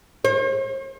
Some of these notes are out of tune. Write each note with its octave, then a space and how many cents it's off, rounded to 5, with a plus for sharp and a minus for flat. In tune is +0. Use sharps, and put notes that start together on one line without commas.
C5 +45